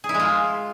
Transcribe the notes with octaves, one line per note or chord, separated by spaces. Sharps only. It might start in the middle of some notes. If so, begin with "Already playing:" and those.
G#4
E4
G#3
F4